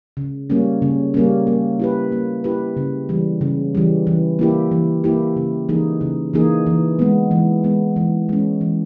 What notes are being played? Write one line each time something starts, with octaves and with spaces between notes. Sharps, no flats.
C#3
G3 A#3 C#4
C#3
G3 A#3 C#4
A#3
E4 G4 B4
A#3
E4 G4 B4
C#3
E3 G3
C#3
E3 G3
E3
A#3 E4 G4
E3
A#3 E4 G4
C#3
E3 A#3 D#4 G#4
C#3
E3 A#3 D#4 G#4
E3
G#3 B3
E3
G#3 B3
E3
G#3 C#4
E3